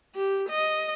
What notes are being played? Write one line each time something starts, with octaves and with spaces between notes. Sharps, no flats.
G4
D#5